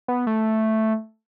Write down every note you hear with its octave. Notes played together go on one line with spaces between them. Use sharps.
B3
A3